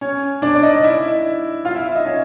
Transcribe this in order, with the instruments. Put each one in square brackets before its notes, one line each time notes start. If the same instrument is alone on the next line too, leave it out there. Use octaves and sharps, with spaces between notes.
[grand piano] C#4 C#5
D4 D5
D5
D#4 D#5
E4 E5
F4 F5
E4 E5
E4 E5
D#4 D#5
C#4 C#5